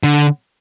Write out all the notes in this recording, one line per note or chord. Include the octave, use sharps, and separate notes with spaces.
D3